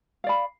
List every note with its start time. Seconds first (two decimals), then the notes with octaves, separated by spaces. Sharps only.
0.24 F5
0.26 D5
0.29 B5